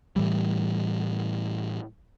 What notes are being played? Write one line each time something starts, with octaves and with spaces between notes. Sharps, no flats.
A2 E3 G3